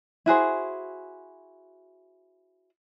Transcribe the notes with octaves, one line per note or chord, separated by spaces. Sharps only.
E4 F#4 G#4 C5